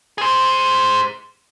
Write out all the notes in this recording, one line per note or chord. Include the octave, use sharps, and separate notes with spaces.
G#4 C5